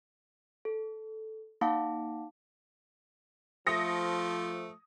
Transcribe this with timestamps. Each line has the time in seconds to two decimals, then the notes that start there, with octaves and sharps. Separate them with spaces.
0.65 A4
1.61 A#3 D#4 F5 F#5 A5 D6
3.67 F3 A3 D#6 A#6 C#7